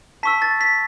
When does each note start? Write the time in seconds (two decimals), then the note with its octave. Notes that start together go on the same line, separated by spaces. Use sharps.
0.23 A5 C#6 E6 B6
0.42 A6
0.61 B6